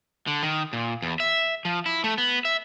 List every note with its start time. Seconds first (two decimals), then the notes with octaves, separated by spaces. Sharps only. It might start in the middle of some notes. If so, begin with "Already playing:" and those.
0.27 D3
0.43 D#3
0.73 A#2
1.02 E2
1.20 E5
1.65 F3
1.86 E4
2.04 A3
2.18 B3
2.45 E5